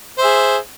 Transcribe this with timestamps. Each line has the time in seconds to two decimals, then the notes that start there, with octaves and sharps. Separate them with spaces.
0.18 C5
0.21 E5
0.24 G#4